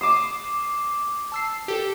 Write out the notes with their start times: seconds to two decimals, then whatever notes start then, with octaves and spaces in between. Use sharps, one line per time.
0.01 D6 D#6 C7 E7
1.32 A5 E6 C7
1.68 G4 A4